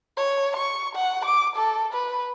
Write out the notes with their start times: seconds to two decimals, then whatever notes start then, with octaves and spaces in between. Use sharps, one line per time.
0.17 C#5
0.57 C#6
0.95 F#5
1.25 D6
1.56 A4
1.93 B4